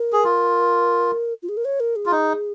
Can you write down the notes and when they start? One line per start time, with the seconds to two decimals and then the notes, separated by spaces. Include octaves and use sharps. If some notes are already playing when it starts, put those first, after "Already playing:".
Already playing: A#4
0.13 G#4
0.24 F4
1.42 F4
1.49 G#4
1.57 A#4
1.65 C#5
1.80 A#4
1.96 G#4
2.06 F4
2.11 D#4